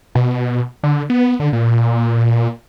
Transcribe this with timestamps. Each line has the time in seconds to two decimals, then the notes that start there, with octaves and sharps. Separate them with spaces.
0.15 B2
0.83 D3
1.10 B3
1.40 D3
1.53 A#2